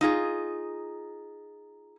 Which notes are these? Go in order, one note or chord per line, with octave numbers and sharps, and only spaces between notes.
D#4 F4 G#4